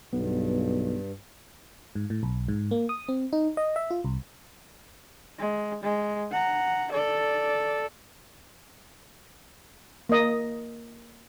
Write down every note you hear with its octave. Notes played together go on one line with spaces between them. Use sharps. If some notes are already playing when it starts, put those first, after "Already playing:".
B1 G2 B3
G#2
A2
B1
G#2
A#3
D#6
C4
D#4
D#5
E5
F4
C2
G#3
G#3
F#5 A#5
A4 D5
A#3 D#5